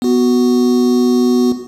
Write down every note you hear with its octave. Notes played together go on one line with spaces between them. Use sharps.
B3 F#4